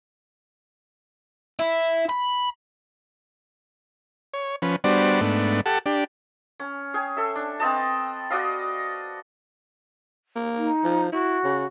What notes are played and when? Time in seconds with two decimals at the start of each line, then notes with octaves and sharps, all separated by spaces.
1.59 E4
2.09 B5
4.34 C#5
4.62 F3 C#4 B4
4.84 G3 B3 D4 F#4 C5 D5
5.21 G#2 A3 B3 D4
5.66 G4 A4 F#5 A5
5.86 D4 G4
6.60 C#4
6.94 G#4 G5 G#5
7.17 A4 E5
7.35 D4
7.60 B3 C4 D#5 A5
8.30 F#4 D5 D#5 F5
10.36 A#3
10.57 D#4
10.84 F3
11.12 E4 F#4
11.44 C#3